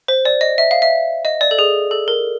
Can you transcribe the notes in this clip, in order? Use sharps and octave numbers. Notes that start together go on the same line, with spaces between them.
C5
D5
D#5
E5
F5
E5
D#5
D5
A4
G#4
A4
A#4